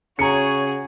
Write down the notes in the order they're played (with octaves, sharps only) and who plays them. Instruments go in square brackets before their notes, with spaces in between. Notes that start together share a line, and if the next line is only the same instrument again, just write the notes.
[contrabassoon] C#3 [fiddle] F#4 G#4 [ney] C#5 [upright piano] A#5 C#7